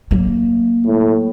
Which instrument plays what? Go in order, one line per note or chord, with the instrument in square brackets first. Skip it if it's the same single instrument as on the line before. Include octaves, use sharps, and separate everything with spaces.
[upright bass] F#3 A#3
[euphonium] A2